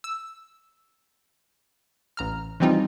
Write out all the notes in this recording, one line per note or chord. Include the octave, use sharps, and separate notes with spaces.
E6
A1 A#5 F6
E3 F3 G3 C4 D#4 F4